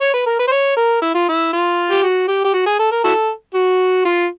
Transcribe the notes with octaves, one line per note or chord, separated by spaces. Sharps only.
C#5
B4
A#4
B4
C5
C#5
A#4
E4
F4
E4
F4
G4
F#4
G4
G4
F#4
G#4
A4
A#4
E4 F#4 A4
F#4
F4